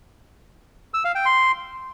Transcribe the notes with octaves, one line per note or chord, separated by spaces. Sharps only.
E6
F5
G5
C6